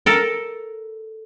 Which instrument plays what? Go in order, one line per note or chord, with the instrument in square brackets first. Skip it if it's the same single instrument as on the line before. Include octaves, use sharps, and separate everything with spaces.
[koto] A4 A#4